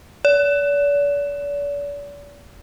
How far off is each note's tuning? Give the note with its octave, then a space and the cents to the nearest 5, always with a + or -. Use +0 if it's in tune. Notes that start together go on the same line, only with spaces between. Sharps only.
D5 -40